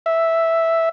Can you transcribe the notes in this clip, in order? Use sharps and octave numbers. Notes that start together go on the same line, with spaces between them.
E5